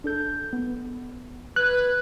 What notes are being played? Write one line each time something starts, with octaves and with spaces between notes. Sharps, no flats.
D4 A4 G6
B3
B4 F#6 G#6